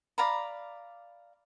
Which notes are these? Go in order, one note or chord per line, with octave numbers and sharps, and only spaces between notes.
D5 F5 A#5 B5